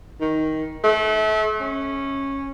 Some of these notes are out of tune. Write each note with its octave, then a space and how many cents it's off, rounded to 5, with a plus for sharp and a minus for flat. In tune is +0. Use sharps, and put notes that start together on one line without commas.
D#3 +10
A3 -30
C#4 -15